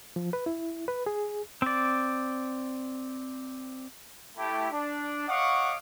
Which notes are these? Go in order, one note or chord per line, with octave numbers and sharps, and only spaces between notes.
F3
B4
E4
B4
G#4
C4 D5
A3 E4 G4
D4
C#5 D#5 F5 F#5 C#6 D6